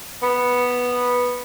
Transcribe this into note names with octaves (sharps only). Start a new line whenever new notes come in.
B3